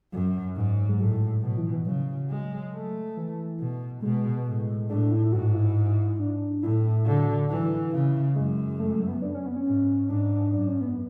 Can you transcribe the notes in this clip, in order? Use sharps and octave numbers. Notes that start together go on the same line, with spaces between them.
F#2 F#3
G#2
G#3
A2 F#3
B2 F#3
E3
E3
C#3 F#3
G#3
A3
E3
B2
B2 G#3
A2
A2 D4
E4
E4
G#2 F#4
E4
D4
A2 E4
D3 F#4
E3
C#3 E4
F#2 G#3
A3
A3
B3
D4
C#4
B3
C#4
G#2
G#2 D4
F#2 D4
C#4
B3